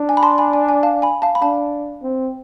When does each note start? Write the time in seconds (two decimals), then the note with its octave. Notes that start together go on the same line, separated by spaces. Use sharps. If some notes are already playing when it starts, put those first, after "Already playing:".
Already playing: D4
0.09 G#5
0.17 B5
0.23 A5 C6
0.38 G#5 B5
0.53 G#5
0.69 G#5
0.83 F5 A5
1.02 G#5 B5
1.22 F5 A5
1.35 B5
1.42 D4 F5 A5
2.02 C4